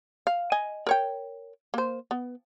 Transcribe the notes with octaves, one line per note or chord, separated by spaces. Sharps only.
F5
D#5 G#5
A#4 C#5 G5
A#3 C5
B3